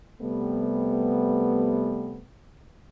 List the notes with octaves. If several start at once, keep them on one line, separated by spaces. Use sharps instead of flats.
C3 G3 A3 B3